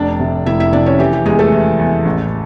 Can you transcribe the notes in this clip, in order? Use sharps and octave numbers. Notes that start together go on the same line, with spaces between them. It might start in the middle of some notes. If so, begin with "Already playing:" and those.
Already playing: F1 D4 D5
C3
F1 E4 E5
E4 E5
C3 D4 D5
C#4 C#5
E3 G4
G4
E2 G#3 G#4
A3 A4
E3
E2
A1